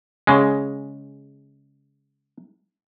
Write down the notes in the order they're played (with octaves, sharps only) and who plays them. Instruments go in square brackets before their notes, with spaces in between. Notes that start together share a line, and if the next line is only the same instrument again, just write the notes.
[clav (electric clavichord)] C#3 G#3